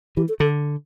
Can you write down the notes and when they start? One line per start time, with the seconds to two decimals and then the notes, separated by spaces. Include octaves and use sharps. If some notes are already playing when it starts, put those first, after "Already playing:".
0.17 E3 G4
0.29 A4
0.40 D3 A4